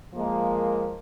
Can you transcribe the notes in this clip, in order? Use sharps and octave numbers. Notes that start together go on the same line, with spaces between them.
F3 G#3 A#3